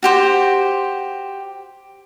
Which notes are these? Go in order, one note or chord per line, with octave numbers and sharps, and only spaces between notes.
F#4 G4 C5